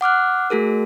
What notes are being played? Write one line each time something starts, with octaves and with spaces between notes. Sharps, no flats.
F#5 D6 F6 F#6
A3 F#4 G#4 A#4